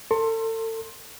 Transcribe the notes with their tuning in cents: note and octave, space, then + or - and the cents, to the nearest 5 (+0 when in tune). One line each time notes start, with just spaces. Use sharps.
A4 +35 C6 +15